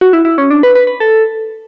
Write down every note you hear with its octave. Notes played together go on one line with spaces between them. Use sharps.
F#4
E4
E4
C#4
D4
B4
B4
B4
A4